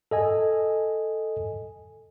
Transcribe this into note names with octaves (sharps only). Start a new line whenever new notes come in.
A4 D#5 G#5